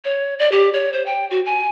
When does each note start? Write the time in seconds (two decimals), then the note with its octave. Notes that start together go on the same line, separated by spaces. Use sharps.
0.05 C#5
0.39 D5
0.52 G4
0.73 C#5
0.93 C5
1.06 G5
1.31 F#4
1.46 G#5